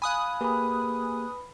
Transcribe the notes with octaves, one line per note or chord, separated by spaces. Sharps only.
F5 G#5 B5 D#6 F#6
A#3 G4 G#4 B4 B5